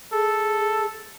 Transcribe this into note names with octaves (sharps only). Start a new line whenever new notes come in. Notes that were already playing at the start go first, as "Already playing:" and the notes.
G#4 A4